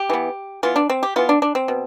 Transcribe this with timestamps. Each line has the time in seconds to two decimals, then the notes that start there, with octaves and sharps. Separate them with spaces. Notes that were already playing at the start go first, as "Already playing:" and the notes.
Already playing: G4
0.10 E3 B3
0.63 E3 B3 F4
0.76 D4
0.90 C4
1.03 G4
1.16 E3 B3 F4
1.29 D4
1.42 D4
1.55 C4
1.68 B2